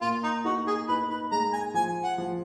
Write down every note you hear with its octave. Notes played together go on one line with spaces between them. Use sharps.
A#2 F4
D#4
D#4 F#4
G#4
D#4 B4
B4
G#3 A#5
G#5
F3 G#5
F#5
F3